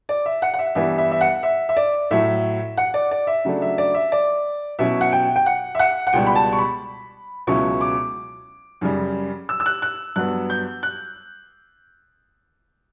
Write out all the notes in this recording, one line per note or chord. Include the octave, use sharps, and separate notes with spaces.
D5
E5
F#5
F#5
E5
G2 E3 G3 B3 E5
E5
E5
F#5
E5
E5
D5
A2 F#3 A3 E5
F#5
D5
D5
E5
C#3 F#3 A3 D4
E5
D5
E5
D5
B2 F#3 C#4 E4 E5
F#5
G5
G5
F#5
E5
F#5
F#5
C#2 B2 G3 G5
B5
A5
C#6
B5
C#2 B2 F#3 C#4 E4 C#6
D6
F#2 C#3 G3
E6
E6
F#6
F#6
G2 F#3 B3 F#6
G6
F#6